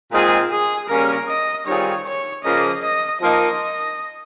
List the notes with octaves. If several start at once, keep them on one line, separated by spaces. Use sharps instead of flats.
A#2 G#3 C4 D#4 F4 G#4
G#4
C#3 G3 A#3 C#4 A#4
D#5
D#3 G3 C4 F4 G#4 C#5
C#5
C#3 F3 A#3 D#5
D#5
F3 A#3 D#4 D#5